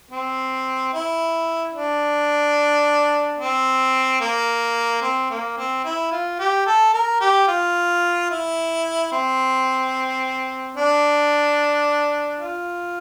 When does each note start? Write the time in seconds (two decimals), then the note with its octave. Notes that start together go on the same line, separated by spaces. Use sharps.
0.11 C4
0.93 E4
1.74 D4
3.38 C4
4.21 A#3
5.02 C4
5.30 A#3
5.57 C4
5.84 E4
6.11 F4
6.39 G4
6.67 A4
6.93 A#4
7.21 G4
7.48 F4
8.31 E4
9.12 C4
10.77 D4
12.40 F4